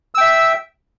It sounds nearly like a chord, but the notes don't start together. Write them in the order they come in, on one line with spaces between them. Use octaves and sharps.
E6 G5 E5